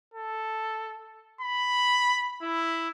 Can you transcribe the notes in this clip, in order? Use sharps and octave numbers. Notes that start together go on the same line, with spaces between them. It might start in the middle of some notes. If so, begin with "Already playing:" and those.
A4
B5
E4